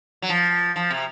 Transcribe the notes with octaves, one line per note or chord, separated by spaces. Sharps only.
F#3
F3
F3
C3